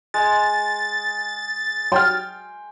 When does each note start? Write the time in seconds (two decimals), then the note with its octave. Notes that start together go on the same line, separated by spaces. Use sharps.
0.14 G#3 A6
1.92 F#3 G5 C6 F6